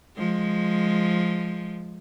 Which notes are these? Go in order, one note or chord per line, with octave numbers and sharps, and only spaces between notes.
F3 G#3